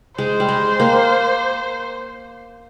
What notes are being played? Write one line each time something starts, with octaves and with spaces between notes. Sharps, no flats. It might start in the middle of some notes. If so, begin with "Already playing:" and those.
G#3 C5
G3
G#3
A#3